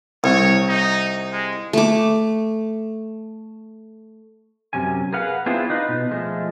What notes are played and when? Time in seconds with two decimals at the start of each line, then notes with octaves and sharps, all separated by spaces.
0.24 C2 C#5
0.68 D#4
1.32 G#3
1.73 A3 D6
4.73 F#2 C3 C#4 G#5
5.13 G#4 A#4 B4 F5 F#5
5.46 B3 C4 D4 E4 F4 G#4
5.70 D#4 F4 B4
5.89 B2
6.11 F3 G#3 A3